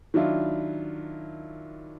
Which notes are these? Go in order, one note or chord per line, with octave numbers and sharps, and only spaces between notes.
D#3 F#3 D4 E4 F4